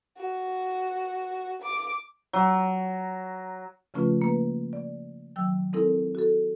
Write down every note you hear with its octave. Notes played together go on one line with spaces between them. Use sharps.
F#4
D6
F#3
C#3 F3 A3 C#4 F4 B4
A#3 B4
D5
D#3 F#3 G5 E6
G#3 C4 D#4 E4 A4 A#4
F#4 A4